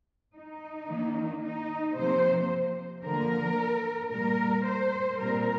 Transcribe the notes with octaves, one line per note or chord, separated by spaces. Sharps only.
D#4
D#3 A#3
D#4
C3 F3 A#3 C5
D3 F3 A#3 A#4
A#2 G3 A#3 A#4
C5
A#2 G3 C4 A#4